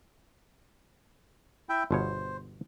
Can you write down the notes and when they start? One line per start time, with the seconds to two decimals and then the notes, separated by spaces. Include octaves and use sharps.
1.69 E4 E5 G5
1.91 G1 B2 C5 C#5